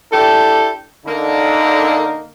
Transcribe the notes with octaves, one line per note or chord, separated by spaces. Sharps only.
D4 E4 G4 A4
D3 A#3 D#4